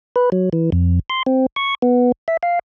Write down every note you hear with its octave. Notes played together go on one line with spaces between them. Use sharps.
B4
F#3
E3
F2
C6
C4
C#6
B3
E5
F5